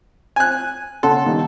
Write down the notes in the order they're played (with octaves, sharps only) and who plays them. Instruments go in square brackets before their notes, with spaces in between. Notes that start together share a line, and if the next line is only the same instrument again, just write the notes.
[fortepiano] G#5 F#6
[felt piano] C#3 F#5 C6 [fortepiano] A4
[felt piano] A#2 D#3 G3